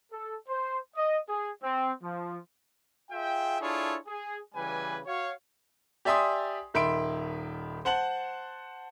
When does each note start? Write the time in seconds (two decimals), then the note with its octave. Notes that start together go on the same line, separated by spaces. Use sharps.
0.12 A4
0.49 C5
0.96 D#5
1.29 G#4
1.63 C4
2.02 F3
3.10 F4 G#4 E5 G5
3.61 D4 E4 F4 G#4 A4 C#5
4.07 G#4
4.55 C#3 E3 G3 B4 G#5
5.06 F#4 C#5 F5
6.05 G4 D5 E5 G#5 C6 D#6
6.74 D#1 D#3 E5 B5 C6 D7
7.85 C5 F#5 A5 F#7